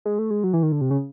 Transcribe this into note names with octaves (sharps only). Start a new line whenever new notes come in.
G#3
A3
G#3
F#3
E3
D#3
D3
C3
C#3